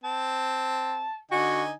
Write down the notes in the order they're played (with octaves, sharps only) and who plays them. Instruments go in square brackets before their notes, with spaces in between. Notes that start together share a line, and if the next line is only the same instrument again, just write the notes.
[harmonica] C4 [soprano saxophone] A5
[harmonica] D3 D#4 G#5 [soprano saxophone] F#4